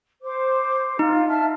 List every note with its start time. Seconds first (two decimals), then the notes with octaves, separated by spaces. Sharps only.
0.23 C5 D6
0.99 D#4 F4
1.28 E5 A5 F6